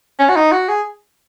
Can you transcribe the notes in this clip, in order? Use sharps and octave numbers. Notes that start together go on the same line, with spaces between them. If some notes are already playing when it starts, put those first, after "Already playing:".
C#4
F#4
D#4
F#4
G#4